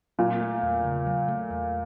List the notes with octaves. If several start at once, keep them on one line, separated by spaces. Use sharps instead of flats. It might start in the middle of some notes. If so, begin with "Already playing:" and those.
A#2 F#3
A3
E2
C#3
F#3
A3
E2